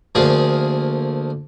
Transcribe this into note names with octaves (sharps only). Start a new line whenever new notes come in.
D2 F3 A#3 G#4